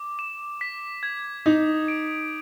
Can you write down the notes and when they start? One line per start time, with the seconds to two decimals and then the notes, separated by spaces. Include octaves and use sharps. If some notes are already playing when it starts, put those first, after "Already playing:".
Already playing: D6
0.19 E7
0.61 B6
1.03 G#6
1.46 D#4 D#6
1.88 D7